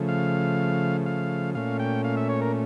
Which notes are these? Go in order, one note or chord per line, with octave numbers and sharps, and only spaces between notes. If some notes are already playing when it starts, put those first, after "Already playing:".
Already playing: C#3 F3 A3
F5
F5
A#2 A3 C#4 F5
G5
F5
E5
C#5
A#4